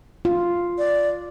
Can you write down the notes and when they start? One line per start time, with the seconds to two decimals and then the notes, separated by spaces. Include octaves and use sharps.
0.25 F4
0.78 D5